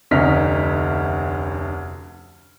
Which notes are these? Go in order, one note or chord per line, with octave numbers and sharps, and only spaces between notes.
F1 D2 C#4 D#4 F6 B6